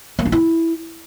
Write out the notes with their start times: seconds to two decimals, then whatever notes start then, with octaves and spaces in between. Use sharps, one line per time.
0.19 A#3
0.26 D4
0.32 E4